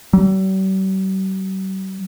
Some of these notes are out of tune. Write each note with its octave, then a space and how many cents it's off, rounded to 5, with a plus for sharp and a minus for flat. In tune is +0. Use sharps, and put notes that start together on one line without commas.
G3 -45